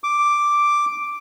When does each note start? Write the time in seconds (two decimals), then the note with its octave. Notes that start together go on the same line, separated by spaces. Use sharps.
0.04 D6